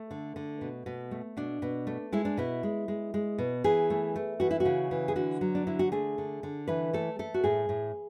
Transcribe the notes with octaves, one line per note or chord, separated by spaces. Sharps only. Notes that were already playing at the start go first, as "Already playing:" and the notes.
Already playing: A3
D3
D3
B2
B2
A3
B2 D4
B2
A3
G#3 E4
D4
B2 E4
G#3
G#3
G#3
B2
E3 G#4
A3
A3
E3 F#4
E4
F#4
C#3
E3
G#4
D3 F#4
F#3
D4
D3 E4
F#4
A3 G#4
D3
D3
E3 B4
A3 A4
A3 A4
F#4
A2 G#4
A2